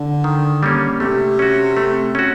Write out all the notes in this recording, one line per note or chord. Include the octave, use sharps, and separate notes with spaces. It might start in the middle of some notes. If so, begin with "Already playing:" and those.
Already playing: D3
D#3
G3 A#3 C#4
C3 A3
C#4 F#4
A3
C#4 F#4